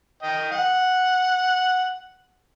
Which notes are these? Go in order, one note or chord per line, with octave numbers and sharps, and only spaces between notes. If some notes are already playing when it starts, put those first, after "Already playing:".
D#5 G5
F#5